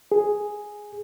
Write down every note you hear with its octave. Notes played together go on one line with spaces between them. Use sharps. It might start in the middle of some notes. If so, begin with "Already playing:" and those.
G#4